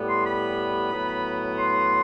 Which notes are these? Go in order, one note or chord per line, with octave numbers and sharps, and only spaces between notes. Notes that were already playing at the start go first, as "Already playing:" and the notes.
Already playing: A2 G3 B3
C6
B5
A2 F#3 B3
C6